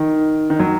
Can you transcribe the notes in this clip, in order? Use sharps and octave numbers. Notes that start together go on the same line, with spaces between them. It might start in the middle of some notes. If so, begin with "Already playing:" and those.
Already playing: D#3
D#3
F#3